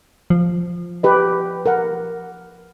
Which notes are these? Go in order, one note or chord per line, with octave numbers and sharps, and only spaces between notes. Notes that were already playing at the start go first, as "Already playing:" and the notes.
F3
G4 B4 D#5
A#4 F#5